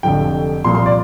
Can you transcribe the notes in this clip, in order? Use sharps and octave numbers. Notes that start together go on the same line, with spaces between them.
F1 F2 D3 F3 G5
C2 A#2 F3 C6
C6
D5